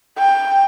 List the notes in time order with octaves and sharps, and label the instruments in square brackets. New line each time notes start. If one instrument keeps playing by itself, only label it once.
[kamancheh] G5